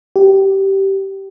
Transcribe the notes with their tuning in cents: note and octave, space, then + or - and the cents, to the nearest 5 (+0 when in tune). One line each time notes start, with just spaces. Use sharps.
G4 -15